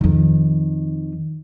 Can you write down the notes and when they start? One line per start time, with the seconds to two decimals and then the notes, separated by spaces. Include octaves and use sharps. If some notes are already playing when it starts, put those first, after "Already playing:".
0.01 F2 D#3